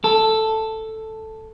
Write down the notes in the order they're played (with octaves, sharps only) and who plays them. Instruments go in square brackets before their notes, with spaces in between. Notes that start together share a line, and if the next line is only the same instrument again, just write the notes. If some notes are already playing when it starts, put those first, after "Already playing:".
[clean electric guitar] A4